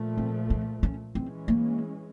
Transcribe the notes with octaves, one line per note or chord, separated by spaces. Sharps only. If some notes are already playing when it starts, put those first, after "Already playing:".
Already playing: A#2 F3 A3
C4
C4
C#4
E3 G#3 C4 C#4
A#3